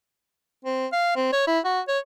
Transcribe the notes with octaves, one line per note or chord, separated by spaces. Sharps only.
C4
F5
C4
C#5
E4
F#4
C#5